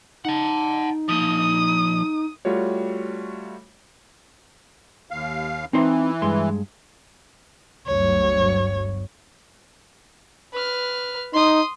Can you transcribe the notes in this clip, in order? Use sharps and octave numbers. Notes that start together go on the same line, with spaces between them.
D#4 F#5 A5
F3 A#3 D#6
G3 A3 F4 F#4 C#5
D#2 F5
E3 C4 D#4 C5
G2 G#3 C6
G1 D2 F#3 C#5
B4 F6
D#4 C6 D#6